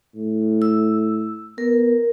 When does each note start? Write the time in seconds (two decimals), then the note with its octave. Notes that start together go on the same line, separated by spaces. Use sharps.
0.15 A2
0.62 E6
1.58 B3 A#4